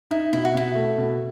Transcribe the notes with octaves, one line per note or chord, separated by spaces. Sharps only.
D#4 E4
B2 E4
F#4
B2 E4
A3
B2